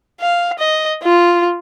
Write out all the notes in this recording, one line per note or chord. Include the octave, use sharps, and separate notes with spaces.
F5
D#5
F4